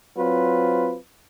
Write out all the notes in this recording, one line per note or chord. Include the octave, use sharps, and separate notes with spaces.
F#3 C4 F4 B4